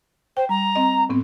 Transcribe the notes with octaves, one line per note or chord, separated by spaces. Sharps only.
C5 G5
G3 A#5
C4 D#5
A2 B3 C4